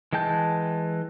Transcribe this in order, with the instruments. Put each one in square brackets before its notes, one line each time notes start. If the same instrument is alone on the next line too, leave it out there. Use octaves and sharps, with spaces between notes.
[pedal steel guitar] E3 G#3 G5 A5 G6